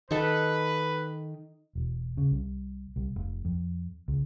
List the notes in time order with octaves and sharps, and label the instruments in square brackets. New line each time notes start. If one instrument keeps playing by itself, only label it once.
[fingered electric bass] D#3 [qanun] D#4 A4 [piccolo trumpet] B4
[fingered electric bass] E1
C#3
C2
C2
F1
F2
C#2